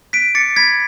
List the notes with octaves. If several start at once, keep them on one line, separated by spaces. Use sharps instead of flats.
F#6 B6 D7
D6 A6 C#7
B5 G#6 B6